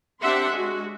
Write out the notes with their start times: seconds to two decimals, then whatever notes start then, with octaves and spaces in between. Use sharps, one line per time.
0.21 C4 D4 G4 E5 F#5 C6
0.52 G#3 F#4